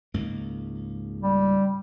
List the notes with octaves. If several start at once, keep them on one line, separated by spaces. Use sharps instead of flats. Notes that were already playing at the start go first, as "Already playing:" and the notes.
C#2 G#2 A#3
G3